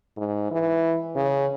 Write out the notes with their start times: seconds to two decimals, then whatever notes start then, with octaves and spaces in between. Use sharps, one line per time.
0.17 G#2
0.51 E3
1.16 C#3